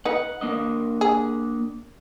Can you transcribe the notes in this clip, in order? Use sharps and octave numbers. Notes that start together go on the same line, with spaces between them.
D#4 B4 F#5
A#3 D4 D#5
G#4